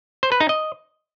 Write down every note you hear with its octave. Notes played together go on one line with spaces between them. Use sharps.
C5
B4
D#4
D#5